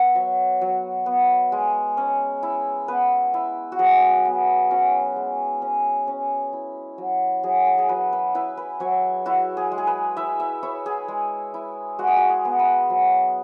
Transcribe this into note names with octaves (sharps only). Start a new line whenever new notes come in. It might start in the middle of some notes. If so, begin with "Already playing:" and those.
Already playing: B3 E5 F#5
F#3 C#5
F#3
B3
G#3
C#4
E4
B3 B4
E4
F#4
F#3 G#4
B3
C#4 F#4
G#3
C#4
C#4
E4
F#3
F#3 G#4
G#4
G#4
F#3 B4
B4
E4 B4
B4
F#3 C#5
E4 F#4
G#4
G#3
G#4
B4
E4 E5
E5
E4 C#5
G#4
G#3
E4
G#3 F#4
G#4
F#4
G#4
B3
B4
F#3